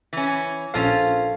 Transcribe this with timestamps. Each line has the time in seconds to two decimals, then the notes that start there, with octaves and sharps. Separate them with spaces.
0.13 E3 C#4
0.74 A#1 C#4 F4 A4 C5 F5